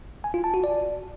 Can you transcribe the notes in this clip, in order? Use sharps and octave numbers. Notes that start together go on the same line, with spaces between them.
G#5
F4
A5
F#4
D5